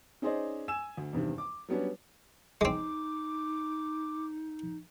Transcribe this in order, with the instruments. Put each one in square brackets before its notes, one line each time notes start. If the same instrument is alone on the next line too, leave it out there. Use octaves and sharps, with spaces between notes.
[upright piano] C#4 D#4 G#4 C5 D5 D#5
G#5 E6 E7
D2
E2 G2 C3 D#3
D6
F#3 G3 B3 C#4 D4
[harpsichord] G#3 C4 [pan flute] D#4 [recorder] D6